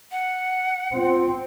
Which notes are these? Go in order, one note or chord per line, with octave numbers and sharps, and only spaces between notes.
F#5
C4 F4